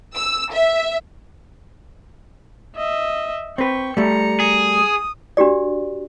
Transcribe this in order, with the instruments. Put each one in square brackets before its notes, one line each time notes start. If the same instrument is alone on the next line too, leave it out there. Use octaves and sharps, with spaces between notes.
[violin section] E6
E5
[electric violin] D#5 E5
[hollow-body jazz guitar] C4 B4 [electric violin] G5 C#6
[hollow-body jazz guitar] G3 A3 [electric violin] A#5 C#7
[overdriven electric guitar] G#4
[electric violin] D#6
[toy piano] D4 F#4 G4 D5